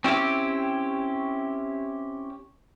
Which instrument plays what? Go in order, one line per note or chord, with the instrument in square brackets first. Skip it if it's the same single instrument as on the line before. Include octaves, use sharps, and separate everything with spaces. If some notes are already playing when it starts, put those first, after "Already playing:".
[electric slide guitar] C4 C#4 E4 G4